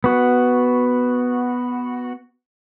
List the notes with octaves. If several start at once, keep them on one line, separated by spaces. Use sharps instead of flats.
B3 F#4